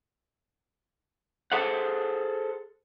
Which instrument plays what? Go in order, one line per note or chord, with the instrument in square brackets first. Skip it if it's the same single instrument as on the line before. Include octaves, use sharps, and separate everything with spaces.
[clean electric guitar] G#4 A4 C5 F#5